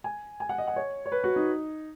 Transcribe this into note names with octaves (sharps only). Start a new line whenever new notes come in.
G#5
G#5
F#5
D#5
F#5
C#5
C#5
B4
F#4
D#4